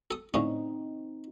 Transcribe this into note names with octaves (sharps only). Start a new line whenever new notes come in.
A4 D#6
A2 D3 C4 C#4 D#4